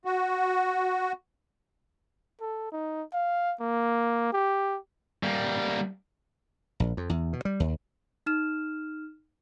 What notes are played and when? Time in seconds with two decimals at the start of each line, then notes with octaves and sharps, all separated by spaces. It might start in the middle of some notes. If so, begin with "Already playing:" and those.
0.05 F#4
2.41 A4
2.72 D#4
3.13 F5
3.60 A#3
4.33 G4
5.23 G3 A#3
6.80 A#1
6.97 F2
7.10 E2
7.33 B2
7.45 G3
7.60 D#2
8.26 D#4 F6 E7